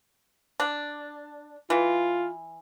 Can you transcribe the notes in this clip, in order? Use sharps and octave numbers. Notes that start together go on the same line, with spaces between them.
D4
E3 F4